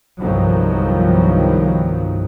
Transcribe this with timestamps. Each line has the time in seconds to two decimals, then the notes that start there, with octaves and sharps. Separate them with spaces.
0.20 G1 C2 G2 D#3 F3 F#3